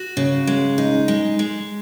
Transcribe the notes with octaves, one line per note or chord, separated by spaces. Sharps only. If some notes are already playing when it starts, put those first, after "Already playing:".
Already playing: F#4
C#3
G#3
D#4
G#3
G#3